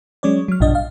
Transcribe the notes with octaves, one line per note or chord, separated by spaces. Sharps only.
F#3 G#3 C#4 C#5 D5
F#3 F6
A#1 G2 B2 D4 D#5
F5